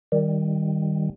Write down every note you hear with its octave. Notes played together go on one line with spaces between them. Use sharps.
D#3 G3